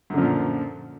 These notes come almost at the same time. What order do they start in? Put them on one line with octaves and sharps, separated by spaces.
F#2 D3 F3 A#2